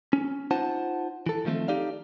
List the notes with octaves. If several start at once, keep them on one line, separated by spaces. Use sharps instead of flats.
C#4
D#4 F4 C5 F#5 A5
E3 A4
D#3 F3 A3 A#3 C4
D#4 G4 A4 D5 F5